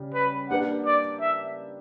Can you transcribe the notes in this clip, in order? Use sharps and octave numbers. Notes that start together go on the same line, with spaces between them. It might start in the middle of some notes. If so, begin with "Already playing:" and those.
Already playing: C#3 G3
B4
A#3 D4 G4 B4 F#5
D5
E5